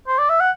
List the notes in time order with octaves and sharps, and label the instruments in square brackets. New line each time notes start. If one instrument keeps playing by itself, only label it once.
[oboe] C5
D5
E5
F#5